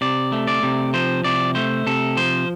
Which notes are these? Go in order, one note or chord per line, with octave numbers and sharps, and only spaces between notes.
C3 D5
A3
D5
C3
F3 C5
C3 D5
A3 C5
C3 A4
F3 C5